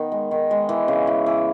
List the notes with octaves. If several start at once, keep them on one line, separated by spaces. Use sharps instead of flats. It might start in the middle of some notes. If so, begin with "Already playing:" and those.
Already playing: D#3 B3
G#3
D#3
G#3
E3
C#3
E3
E3